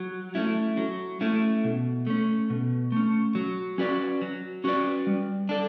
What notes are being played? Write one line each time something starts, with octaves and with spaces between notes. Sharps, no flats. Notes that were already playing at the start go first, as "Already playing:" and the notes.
Already playing: F#3
A3 C#4 E4
F#3
A3 C#4 E4
B2
A3 C#4
B2
A3 C#4
F#3
C#4 F#4 B4 D5
F#3
C#4 F#4 B4 D5
G3
D4 A4 D5